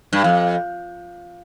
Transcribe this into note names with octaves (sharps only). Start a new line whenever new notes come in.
G2
F2